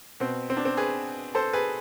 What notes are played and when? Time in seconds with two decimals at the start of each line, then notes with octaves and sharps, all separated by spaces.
0.20 B2 C4
0.50 C4
0.57 D4
0.65 C4
0.77 G#4 B4
1.35 A4 C5
1.53 G#4 B4